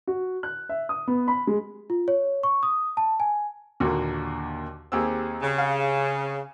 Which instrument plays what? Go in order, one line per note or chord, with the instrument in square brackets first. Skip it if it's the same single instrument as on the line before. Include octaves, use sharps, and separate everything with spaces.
[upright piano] F#4
F#6
E5
D#6
B3
B5
G#3
[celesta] F4
C#5
C#6
D#6
A5
G#5
[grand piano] D#2 A#2 D3 [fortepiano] A#3 F#4
[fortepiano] D#2 E6 [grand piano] C4 G4 G#4
[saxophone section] C#3
[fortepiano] F5